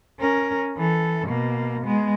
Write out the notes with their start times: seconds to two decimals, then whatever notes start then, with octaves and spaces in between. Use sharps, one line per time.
0.19 C#4 A#4
0.76 E3 A4
1.28 B2 A#3
1.84 G#3 B3